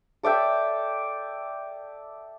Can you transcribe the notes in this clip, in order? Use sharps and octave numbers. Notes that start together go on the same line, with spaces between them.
A4 D5 E5 G5